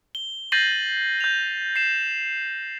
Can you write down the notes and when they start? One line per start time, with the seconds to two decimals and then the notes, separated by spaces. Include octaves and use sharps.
0.15 G7
0.52 G6 A6 A#6 C7 D#7 F#7
1.20 G6 F7
1.76 C7 E7